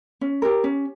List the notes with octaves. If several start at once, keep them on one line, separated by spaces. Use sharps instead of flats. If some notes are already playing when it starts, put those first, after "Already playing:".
C#4
G4 A#4
C#4